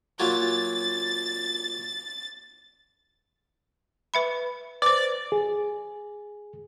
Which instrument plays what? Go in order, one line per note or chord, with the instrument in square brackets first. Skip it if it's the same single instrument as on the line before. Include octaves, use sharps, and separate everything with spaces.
[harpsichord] A#2 F#3 [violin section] A6
[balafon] B4 E5 B5
[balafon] B4 C5 [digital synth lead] D5
[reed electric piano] G#4